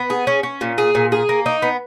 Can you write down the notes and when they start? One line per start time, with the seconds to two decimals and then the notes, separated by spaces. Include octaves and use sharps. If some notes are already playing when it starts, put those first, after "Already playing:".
Already playing: B3
0.10 G#4
0.27 C#4
0.43 C#4
0.61 A#2
0.78 G#4
0.95 A#2
1.12 G#4
1.29 A#3
1.46 D#4
1.62 B3